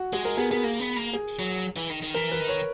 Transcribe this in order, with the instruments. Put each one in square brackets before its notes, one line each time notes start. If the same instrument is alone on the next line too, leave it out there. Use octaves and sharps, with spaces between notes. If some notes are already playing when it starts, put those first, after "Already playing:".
Already playing: [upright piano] F#4
[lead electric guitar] G#3 [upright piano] G#4
[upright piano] A#4
[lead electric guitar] B3 [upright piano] G#4
[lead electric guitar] B3 [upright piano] G#4
[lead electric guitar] A#3
B3
A#3
[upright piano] G#4
[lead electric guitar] F#3
E3
D#3
D#3
[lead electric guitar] E3 [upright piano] A#4
[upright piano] B4
[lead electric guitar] D#3
[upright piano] C#5